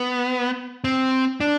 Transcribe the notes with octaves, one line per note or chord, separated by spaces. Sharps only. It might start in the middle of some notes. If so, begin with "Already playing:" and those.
Already playing: B3
C4
D4